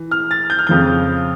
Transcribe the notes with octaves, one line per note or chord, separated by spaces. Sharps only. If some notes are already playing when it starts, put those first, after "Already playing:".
Already playing: E3
F6
A6
G6
F6
F2 C#3 F3 G6